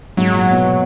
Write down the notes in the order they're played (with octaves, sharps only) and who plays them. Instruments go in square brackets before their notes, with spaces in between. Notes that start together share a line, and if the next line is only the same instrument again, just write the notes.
[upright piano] G#2 [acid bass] F#3
[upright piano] A#2
B2